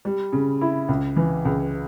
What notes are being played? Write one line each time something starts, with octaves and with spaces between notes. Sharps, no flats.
G3
C#3
E4
C#2
E3
C#2